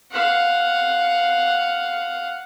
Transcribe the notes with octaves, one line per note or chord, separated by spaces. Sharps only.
F5 F#5